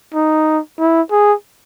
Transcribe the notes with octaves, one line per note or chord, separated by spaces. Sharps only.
D#4
E4
G#4